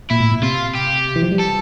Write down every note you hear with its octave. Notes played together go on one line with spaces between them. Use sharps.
A#2 E4
A2
A#2
C3 F4
G4
E3
F3
G3
A4